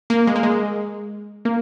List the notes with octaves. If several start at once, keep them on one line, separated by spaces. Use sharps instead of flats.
A#3
G#3
A#3
G#3
A#3